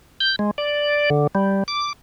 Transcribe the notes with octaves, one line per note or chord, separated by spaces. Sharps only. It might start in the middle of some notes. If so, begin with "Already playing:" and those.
G6
G#3
D5
D3
G3
D6